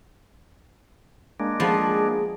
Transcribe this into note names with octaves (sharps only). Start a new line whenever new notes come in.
G#3 A#3 D4
F3 B3 G#4